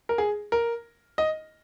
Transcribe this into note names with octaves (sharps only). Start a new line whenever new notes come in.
A#4
G#4
A#4
D#5